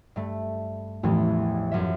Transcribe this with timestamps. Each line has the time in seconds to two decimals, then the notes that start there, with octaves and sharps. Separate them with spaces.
0.16 G2 A3
1.03 A1 E2 E3 F3
1.72 F#2 F3 E5